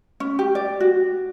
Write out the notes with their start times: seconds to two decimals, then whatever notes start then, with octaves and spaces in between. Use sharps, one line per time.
0.20 C#4
0.39 G4
0.55 D5
0.80 F#4